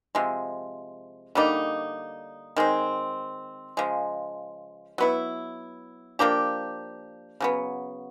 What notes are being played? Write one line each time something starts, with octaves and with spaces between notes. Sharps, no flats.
C3 F3 G#3
D3 G3 A#3 D#4
D#3 G#3 C4
C#3 F3 G#3
F#3 B3 E4
F3 A#3 D4 G4
C#3 F#3 B3